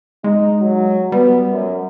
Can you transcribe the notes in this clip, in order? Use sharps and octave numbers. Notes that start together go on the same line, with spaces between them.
G#3 D#4
F#3
G3 B3
F#2